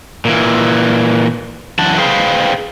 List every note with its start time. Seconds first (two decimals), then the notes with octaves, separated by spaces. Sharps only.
0.25 A#2 E3
1.79 F#2 E3 F#5 A5
1.98 G#4 B4 C5 F5 G5